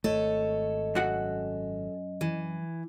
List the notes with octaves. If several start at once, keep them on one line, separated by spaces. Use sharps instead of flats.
G#1 D#2 A3 A4 C#5 D#5
F#2 F#4 F#5
E3